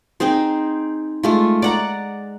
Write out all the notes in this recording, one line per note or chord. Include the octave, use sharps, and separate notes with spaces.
C4 D#4 G#4 C5
G#3 A3 F4
D5 F#5 A#5